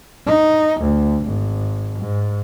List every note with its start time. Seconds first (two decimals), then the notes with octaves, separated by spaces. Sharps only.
0.26 D#4
0.81 D2
1.25 G#1
1.99 G#2